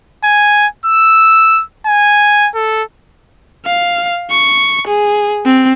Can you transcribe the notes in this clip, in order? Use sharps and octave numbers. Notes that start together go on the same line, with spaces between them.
G#5
E6
G#5
A4
F5
C#6
G#4
C4